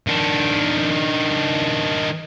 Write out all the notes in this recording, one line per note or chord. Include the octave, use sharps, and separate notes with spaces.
D#3 D4